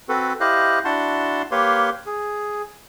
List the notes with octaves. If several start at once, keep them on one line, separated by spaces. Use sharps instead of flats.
C4 F#4 A4 B4
E4 G4 C5 D#5 F5 F#6
D4 E4 F#4 F#5 A5 C6
A#3 G4 B4 C#5 F5 C6
G#4